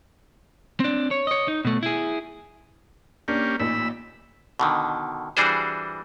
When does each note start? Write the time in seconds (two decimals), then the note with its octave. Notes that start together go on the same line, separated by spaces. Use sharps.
0.80 C4 D4
1.11 C#5
1.27 C#5 D#5
1.48 D#4
1.65 B2 A3
1.83 E4 G#4
3.28 A#3 C#4 D4 G4
3.60 A1 A#2 D#4 B5 E6
4.60 B2 D3 D#3
5.37 E3 G3 D4 F#4 G#4 C5